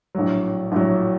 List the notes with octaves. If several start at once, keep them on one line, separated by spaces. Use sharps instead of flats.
A#1 A2 F#3
A#1 A2 F#3